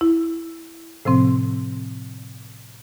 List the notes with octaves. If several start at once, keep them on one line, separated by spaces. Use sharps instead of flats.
E4
A2 C3 F3 C4